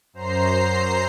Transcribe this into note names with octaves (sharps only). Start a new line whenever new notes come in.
F#2 C5 A#5 C7